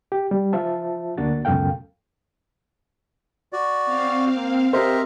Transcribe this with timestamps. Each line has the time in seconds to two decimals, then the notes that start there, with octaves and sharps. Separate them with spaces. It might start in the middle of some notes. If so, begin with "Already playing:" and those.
0.12 G4
0.31 G3
0.53 F3 F4 C5 E5 A5
1.18 D2 A#3 D4 F#4 A6
1.45 C#2 F#2 B2 A4 F5 G5
3.53 F#4 D5
3.86 C4 F5
4.36 A#3
4.73 G4 A#4 C5 D#5 E5